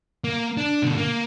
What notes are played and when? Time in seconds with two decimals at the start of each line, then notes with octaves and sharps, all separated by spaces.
0.24 A#3
0.57 D4
0.83 B2 D3
0.98 A#3